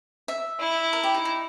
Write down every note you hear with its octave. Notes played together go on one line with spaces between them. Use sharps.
E5
E4
A#4
G4
D#4
D#4